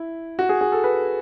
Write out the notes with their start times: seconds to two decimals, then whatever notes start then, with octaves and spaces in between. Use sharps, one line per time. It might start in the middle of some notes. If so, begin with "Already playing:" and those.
Already playing: E4
0.39 F#4
0.49 G#4
0.61 G#4
0.72 A4
0.84 B4